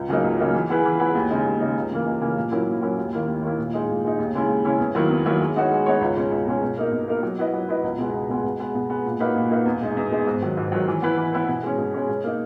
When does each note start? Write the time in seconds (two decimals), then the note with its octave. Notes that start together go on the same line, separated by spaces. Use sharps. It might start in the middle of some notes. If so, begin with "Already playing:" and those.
Already playing: C#2
0.08 C#3 F#3 A#3 D#4
0.24 C#2
0.39 C#3 F#3 A#3 D#4
0.54 E3
0.70 B3 E4 G#4 B4
0.85 E3
0.99 B3 E4 G#4 B4
1.15 D#2
1.30 C#3 G#3 D#4
1.45 D#2
1.60 C#3 G#3 D#4
1.76 C#2
1.91 C#3 E3 A#3
2.06 C#2
2.21 C#3 E3 A#3
2.37 A#2
2.51 F#3 C#4 E4 A#4
2.67 A#2
2.82 F#3 C#4 E4 A#4
2.98 D#2
3.13 D#3 A#3 E4
3.27 D#2
3.42 D#3 A#3 E4
3.58 A#2
3.73 G#3 D#4
3.89 A#2
4.04 G#3 D#4
4.18 D#2
4.34 C#3 G#3 C#4 E4
4.49 D#2
4.64 C#3 G#3 C#4 E4
4.80 E2
4.95 D#3 F#3 A#3 E4
5.10 E2
5.25 D#3 F#3 A#3 E4
5.41 G#3
5.56 B3 D#4 F#4 C#5
5.71 G#3
5.86 B3 D#4 F#4 C#5
6.01 C#2
6.16 B2 G#3 C#4
6.32 C#2
6.46 B2 G#3 C#4
6.62 B2
6.77 A#3 D#4 A#4
6.92 B2
7.08 A#3 D#4 A#4
7.23 F#3
7.38 B3 E4 B4 D#5
7.53 F#3
7.68 B3 E4 B4 D#5
7.83 C#2
7.98 B2 G#3 B3
8.14 C#2
8.29 B2 G#3 B3
8.44 B2
8.60 G#3 B3
8.75 B2
8.90 G#3 B3
9.05 A#2
9.20 A#3 D#4 F#4 B4
9.36 A#2
9.50 A#3 D#4 F#4 B4
9.66 E2
9.81 B2 G#3 D#4
9.97 E2
10.11 B2 G#3 D#4
10.27 G#2
10.42 D#3 F#3
10.57 G#2
10.72 D#3 F#3
10.88 E3
11.02 B3 E4 B4
11.17 E3
11.33 B3 E4 B4
11.48 B2
11.63 G#3 C#4
11.78 B2
11.94 G#3 C#4
12.09 B2
12.24 A#3 D#4